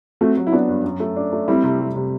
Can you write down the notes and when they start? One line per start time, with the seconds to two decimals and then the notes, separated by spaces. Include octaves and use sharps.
0.21 A3 C4 F#4
0.37 F#3
0.47 E4
0.52 B3 D4 F#4
0.68 G2
0.84 F#2
1.00 A3
1.16 D4
1.32 A3
1.48 G3 C4 E4
1.64 C3
1.80 G3
1.96 C3